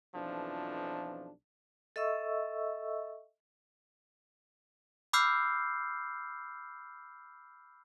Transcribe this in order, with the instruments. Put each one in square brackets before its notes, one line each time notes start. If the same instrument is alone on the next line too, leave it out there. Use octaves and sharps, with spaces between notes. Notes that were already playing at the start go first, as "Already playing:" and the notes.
[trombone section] B1 F2 E3 F3 D4
[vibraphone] A4 D#5 E5 C#6 E6
[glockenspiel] B5 D6 E6 F6 G6 C7